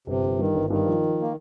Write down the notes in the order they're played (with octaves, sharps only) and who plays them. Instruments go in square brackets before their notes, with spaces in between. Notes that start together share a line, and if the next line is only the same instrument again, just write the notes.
[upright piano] G1 [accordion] C3
[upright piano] G1
[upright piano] G2 [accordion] D#3
[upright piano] G1
[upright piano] G2 [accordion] D#3
[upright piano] F3
F3
[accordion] A#3